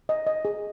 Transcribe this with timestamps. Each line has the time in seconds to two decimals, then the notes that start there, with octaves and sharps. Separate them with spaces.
0.09 D#5
0.26 D#5
0.45 G#4